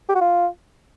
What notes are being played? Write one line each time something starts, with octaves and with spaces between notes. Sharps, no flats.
G4
F#4
F4